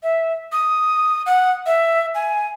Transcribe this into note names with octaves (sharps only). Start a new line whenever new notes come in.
E5
D#6
F#5
E5
G#5